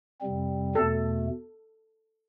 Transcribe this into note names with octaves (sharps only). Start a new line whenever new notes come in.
F2 C3 G3 C4
E2 B2 A3 A4